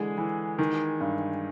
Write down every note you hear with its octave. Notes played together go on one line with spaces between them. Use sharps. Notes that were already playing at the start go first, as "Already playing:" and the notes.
Already playing: D3 E3 G#3 G#4
E3
D#3
G2